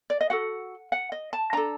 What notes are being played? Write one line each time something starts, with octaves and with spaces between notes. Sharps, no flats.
D5
D#5
F#4 A4 F#5
F#5
D#5
A5
D4 A4 A#5